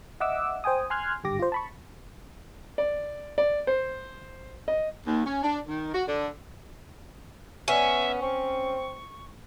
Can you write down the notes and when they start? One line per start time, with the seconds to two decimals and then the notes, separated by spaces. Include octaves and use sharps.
0.20 D#5 E5 F#5 D6 E6
0.64 C5 G5 G#5 D#6
0.90 G#5 C6 F6 F#6 G#6
1.24 G#1 G2 D3 G4 D6 A#6
1.39 F4 C5
1.52 A5 B5 C#6
2.78 D5
3.38 D5
3.67 C5
4.68 D#5
5.07 D#2
5.25 C#4
5.43 D4
5.67 D#3
5.94 F#4
6.07 D3
7.68 B3 C#4 E5
8.22 C4 C#6